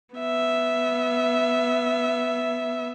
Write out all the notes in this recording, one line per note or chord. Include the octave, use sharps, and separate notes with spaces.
B3 E5